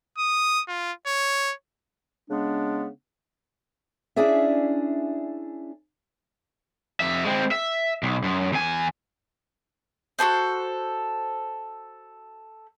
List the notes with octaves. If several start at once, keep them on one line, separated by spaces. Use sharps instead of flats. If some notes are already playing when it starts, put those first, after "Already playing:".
D#6
F4
C#5
C#3 G#3 B3 D4
C#4 D4 E4 G#4 D5 E5
F2 E5
G#3 C4
E5
B1
F#2
E2 G#5
F#4 G#4 A4 C5